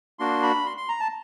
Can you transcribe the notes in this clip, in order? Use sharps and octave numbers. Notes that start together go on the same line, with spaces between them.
A#3 D4 F#4 C6
B5
C6
C6
A#5
A5